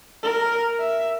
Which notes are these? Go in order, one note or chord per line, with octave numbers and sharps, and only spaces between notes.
A#4
E5